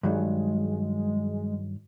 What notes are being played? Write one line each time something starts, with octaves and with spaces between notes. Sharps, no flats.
G2 D#3 F#3 G#3